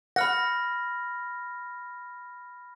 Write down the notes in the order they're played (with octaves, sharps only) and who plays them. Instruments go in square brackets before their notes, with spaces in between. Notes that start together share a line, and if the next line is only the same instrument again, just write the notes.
[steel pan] F#5 [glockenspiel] B5 F6 A#6